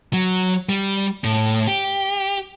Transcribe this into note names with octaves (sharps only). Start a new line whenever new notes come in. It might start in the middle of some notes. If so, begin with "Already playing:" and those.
F#3
G3
A2
G4